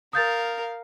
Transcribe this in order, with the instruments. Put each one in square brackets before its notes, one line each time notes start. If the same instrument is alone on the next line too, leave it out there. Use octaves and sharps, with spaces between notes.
[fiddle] A#4 [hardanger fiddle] F5 [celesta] D#6 G6 A6